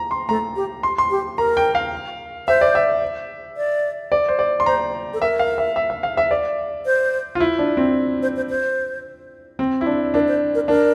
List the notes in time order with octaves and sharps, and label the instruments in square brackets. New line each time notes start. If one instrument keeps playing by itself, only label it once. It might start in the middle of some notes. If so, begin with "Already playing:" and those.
Already playing: [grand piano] A#5
C6
[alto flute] A3 [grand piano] A#5
[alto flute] G4
[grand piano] C6
C6
[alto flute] G4
[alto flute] A#4 [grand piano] A#5
[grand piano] G5
F5
[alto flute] C5 [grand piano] E5
[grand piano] D5
E5
[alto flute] D5
[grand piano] D5
C5
D5
C6
[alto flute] C5 [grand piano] A#5
[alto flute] A4
[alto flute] A#4 [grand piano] E5
[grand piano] F5
E5
E5
E5
F5
E5
D5
[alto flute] C5
[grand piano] F4
E4
D4
C4
[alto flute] C5
C5
C5
[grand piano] C4
E4
D4
[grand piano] D4 [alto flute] A#4
[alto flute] C5
A#4
[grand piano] D4 [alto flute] A#4